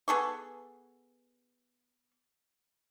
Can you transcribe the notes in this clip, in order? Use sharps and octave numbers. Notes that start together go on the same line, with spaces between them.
B3 G#4 A4 C#6